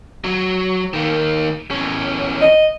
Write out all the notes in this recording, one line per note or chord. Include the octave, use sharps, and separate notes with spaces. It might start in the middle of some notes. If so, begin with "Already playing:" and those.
F#3
D#3 A#3
E2 C#4
D#5